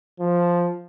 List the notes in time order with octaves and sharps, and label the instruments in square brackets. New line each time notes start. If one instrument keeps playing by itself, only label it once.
[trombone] F3